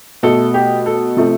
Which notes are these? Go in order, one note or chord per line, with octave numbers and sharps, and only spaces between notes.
B2 A3 A4
G4
A4
C3 F3 A3